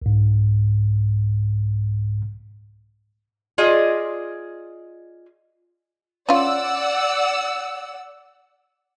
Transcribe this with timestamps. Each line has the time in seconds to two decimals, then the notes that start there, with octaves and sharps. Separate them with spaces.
0.02 C2 G#2
3.58 F4 G#4 D5 D#5
6.29 C#4 F4 D5 F#5 E6